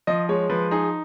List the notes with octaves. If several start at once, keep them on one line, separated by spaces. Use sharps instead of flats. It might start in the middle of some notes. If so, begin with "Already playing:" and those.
F3 D#5
G#3 C#5
F3 B4
D#4 G#4